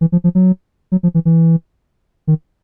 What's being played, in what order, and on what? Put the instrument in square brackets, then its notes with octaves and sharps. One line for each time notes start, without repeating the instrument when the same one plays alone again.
[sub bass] E3
F3
F3
F#3
F#3
F3
E3
E3
D#3